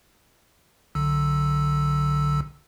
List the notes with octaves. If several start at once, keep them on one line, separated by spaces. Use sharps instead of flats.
B1 D3 E6